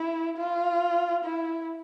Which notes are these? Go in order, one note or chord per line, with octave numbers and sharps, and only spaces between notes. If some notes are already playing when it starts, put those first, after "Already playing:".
Already playing: E4
F4
E4